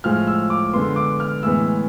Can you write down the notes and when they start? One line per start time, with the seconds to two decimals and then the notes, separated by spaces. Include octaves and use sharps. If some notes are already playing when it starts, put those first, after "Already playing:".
0.04 A2 F3 G#3 F6
0.27 E6
0.50 D6
0.73 D3 G#3 B3 C6
0.96 D6
1.20 F6
1.43 A2 E3 G#3 B3 E6